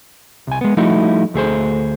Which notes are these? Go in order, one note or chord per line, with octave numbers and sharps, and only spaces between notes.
C2 G#5
G#3 B3
F3 G3 A3 D#4 E4 F#4
D2 A3 G#4 C5